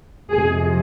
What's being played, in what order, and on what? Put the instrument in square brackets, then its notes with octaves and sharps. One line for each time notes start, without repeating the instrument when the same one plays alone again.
[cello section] F2 C3 F3 G#3 G#4